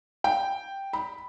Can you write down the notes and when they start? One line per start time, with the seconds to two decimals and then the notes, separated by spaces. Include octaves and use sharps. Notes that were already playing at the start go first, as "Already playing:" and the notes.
0.24 G5
0.93 B5